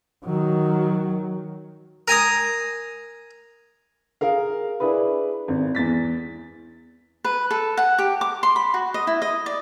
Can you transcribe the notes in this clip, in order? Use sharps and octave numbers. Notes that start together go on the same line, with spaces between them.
D#3 F#3
A#4 G#5 A#5 D#6
G#4 A#4 F5
D4 E4 G#4 B4
G#1
E2 A6 B6
B4
A4
F#5
G4
D6
C6
B5
F#4
D#5
E4
D#5
D5